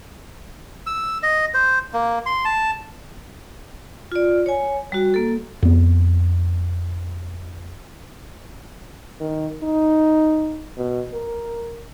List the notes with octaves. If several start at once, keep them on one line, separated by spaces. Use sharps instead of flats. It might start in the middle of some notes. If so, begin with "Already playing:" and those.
E6
D#5
C5
A#3
C6
A5
F4 D5
C#5 G#5
G3 F#4
A#3 A4
F2 B3
D#3
D#4
B2
A#4